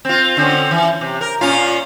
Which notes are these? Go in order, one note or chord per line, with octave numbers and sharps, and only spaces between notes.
C4 F4
D3 C4 C#4
E3
C3
A#4
A#2 C#4 F4